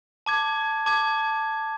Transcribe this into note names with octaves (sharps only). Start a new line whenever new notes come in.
A5 D6 G#6
A5 D6 G#6